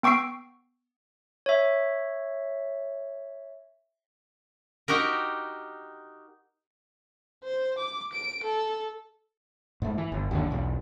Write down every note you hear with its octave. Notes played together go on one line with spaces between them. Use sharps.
B3 G5 C#6 E6 C7 D7
C#5 E5
D#4 F#4 G4 A#4
C5
D6
D7
A4
G#2 A3
E3
G1
F#1 D#2 A2 D3
B1 E2